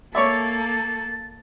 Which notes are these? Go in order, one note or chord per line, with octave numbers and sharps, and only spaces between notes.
A#3 A4 C#5 D5 E5 A6